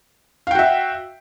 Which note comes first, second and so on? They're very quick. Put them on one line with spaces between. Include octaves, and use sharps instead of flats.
F5 G5 F#4 E5